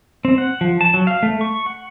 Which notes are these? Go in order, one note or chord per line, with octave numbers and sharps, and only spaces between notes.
C4
F#5
F3
A5
F#3
F5
A3
C#6
F#5